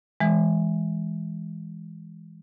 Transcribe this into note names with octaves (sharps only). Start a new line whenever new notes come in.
E3 G#3